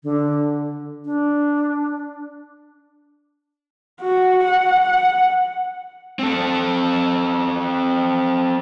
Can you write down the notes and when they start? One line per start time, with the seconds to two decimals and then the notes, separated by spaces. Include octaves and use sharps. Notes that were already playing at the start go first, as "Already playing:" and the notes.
0.04 D3
1.05 D4
4.01 F#4
4.45 F#5
6.19 C4 A4